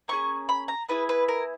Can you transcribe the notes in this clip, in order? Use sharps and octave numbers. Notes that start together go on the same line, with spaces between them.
A#3 C#4 G#4 C#6
B5
A#5
B3 E4 G#4 B4
B4
A#4